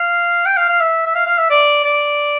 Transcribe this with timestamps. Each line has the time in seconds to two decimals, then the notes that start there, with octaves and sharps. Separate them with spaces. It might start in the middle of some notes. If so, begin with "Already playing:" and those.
Already playing: F5
0.46 G5
0.56 F5
0.69 F5
0.80 E5
1.06 E5
1.15 F5
1.26 F5
1.38 E5
1.50 D5
1.84 D5